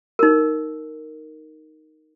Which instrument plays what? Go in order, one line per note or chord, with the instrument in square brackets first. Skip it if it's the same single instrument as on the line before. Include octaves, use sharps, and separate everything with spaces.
[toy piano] D#4 A#4